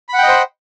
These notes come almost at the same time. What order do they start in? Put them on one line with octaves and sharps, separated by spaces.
B5 F#5 G5 D#5 C5